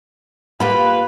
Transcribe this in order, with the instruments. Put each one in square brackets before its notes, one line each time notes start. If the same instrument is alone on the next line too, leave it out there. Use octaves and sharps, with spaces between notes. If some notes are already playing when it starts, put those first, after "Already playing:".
[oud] A#3 F4 G4 [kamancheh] B4 [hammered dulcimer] B5